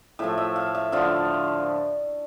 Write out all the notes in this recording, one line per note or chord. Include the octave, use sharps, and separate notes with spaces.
A2 F3 A3 E5
E5
F5
E5
D3 F3 A3 F5